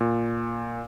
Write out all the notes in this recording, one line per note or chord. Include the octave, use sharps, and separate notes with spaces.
A#2